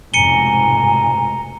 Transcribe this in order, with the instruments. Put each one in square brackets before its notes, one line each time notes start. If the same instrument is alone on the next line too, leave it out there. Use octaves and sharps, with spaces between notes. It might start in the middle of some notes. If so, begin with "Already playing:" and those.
[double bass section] F1 G#2 B2 [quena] G#5 [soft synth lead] A#5 [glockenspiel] C#7 D#7 G7